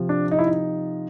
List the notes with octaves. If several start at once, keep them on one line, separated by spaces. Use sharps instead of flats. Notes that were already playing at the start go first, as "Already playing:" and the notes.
Already playing: C3 F3
D4
D#4
E4
D#4